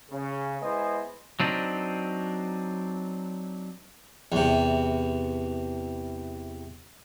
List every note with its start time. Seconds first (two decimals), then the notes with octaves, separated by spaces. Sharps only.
0.11 C#3
0.62 G#3 B3 E4 C5 D#5 G#5
1.40 F#3 C4 D4 D#4
4.32 E2 C3